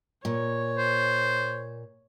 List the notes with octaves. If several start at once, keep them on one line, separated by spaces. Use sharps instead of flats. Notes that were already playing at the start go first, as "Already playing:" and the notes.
A#2 C#5
C5